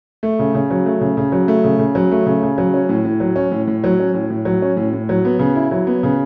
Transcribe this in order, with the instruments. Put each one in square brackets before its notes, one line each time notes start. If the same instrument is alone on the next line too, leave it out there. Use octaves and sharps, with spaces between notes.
[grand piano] A3
C#3
C#3
F#3
A3
C#3
C#3
F#3
A3
C#3
C#3
F#3
A3
C#3
C#3
F#3
C#4
A2
A2
F#3
C#4
A2
A2
F#3
C#4
A2
A2
F#3
C#4
A2
A2
F#3
B3
C#3
E4
F#3
B3
C#3